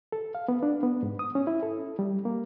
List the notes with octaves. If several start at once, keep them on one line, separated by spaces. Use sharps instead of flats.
A4
F5
B3
D4
B3
G#2
D#6
C#4
E4
A4
G3
A#3